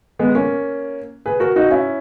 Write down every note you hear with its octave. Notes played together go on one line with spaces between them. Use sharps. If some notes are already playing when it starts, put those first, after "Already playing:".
G#3 B3
A#3 C#4
G#4 B4
F#4 A#4
D#4 F#4
C#4 E4